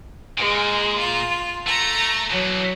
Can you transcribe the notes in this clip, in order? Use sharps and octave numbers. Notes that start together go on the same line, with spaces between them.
A#2 G#3
F4
A3 A#5
B2 E3 F#3